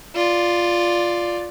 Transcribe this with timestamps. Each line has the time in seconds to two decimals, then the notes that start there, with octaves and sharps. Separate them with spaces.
0.15 F4 D5